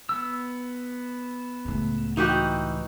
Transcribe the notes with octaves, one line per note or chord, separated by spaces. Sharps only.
B3 E6
C#2 A2
E3 D#4 F#4 G4